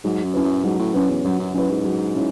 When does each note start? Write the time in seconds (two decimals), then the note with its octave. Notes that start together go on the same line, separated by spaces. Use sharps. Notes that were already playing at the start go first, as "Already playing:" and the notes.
0.04 G#2 F#3
0.24 F#2
0.34 C#4 E4 B4
0.44 F#2
0.64 G#2 F#3
0.79 A2
0.94 F#2 C#4 E4 B4
1.09 E2
1.24 F#2 F#3
1.39 F#2
1.54 F#2 C#4 E4 B4
1.70 G#2
1.84 F#3
2.15 C#4 E4